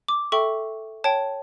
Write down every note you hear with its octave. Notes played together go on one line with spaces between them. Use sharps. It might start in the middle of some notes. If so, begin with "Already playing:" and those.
D6
A4 E5 G5 C#6
C#5 G5 A5